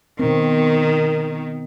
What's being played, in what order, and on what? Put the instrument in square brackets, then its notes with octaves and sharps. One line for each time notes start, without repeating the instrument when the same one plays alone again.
[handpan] B2 C4 [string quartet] D#3 [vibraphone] A#4